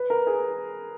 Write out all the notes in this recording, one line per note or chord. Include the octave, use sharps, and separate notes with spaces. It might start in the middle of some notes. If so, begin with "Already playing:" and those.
Already playing: B4
A#4
G#4